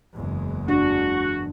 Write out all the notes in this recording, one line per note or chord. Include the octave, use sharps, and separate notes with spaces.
F#1 E2 G#3
D4 F#4